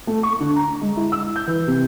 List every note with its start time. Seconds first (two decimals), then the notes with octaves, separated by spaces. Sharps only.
0.07 A3
0.23 C#6
0.40 D3
0.56 A#5
0.81 G#3
0.97 E4
1.12 E6
1.36 G6
1.47 E3
1.67 C3